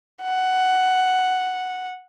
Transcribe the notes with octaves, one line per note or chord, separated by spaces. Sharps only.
F#5